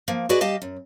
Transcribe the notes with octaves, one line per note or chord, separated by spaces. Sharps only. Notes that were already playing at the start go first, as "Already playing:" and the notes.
F3 A#3
F#4 G#4 B4 D5 D#5
G3 G4 D#5 F5 A5
F#2